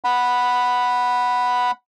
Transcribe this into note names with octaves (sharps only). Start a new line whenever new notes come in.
F#5 B5